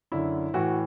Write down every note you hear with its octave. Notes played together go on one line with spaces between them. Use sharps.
F#2 D3 E4
A2 E3 F#4